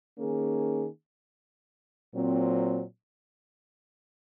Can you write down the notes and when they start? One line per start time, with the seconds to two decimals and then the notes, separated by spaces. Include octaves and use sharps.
0.18 D#3 A#3 C#4 G#4
2.14 A#2 F#3 C4